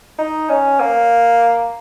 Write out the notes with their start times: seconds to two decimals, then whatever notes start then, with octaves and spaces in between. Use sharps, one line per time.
0.19 D#4
0.50 C#4
0.81 A#3